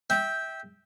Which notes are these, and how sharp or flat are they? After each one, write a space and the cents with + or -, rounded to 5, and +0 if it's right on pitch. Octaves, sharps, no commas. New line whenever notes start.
E5 -20 G5 +0